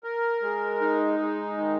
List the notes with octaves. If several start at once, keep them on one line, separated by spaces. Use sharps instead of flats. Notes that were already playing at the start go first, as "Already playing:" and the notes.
A#4
G#3
D#4
G#3
D#3